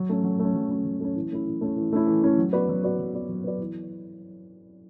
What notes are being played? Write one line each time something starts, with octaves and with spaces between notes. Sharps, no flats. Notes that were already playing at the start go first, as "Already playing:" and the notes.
Already playing: F#3
A3 C#4
F#3
A3
C#4
F#3
A3 C#4
F#3
A3 C#4
E3
A3 C#4 E4
E3
A3 C#4 E4
E3
A3 C#4 E4
E3
A3 C#4 E4
F#3
B3 F#4 B4 D5
F#3
B3 F#4 B4 D5
F#3
B3 F#4 B4 D5
F#3
B3 F#4 B4 D5
E3